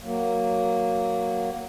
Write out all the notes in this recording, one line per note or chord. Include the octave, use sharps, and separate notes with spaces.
F#3 A#3